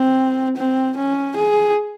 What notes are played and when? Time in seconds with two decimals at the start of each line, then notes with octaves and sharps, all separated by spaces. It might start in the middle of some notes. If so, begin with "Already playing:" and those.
Already playing: C4
0.56 C4
0.97 C#4
1.36 G#4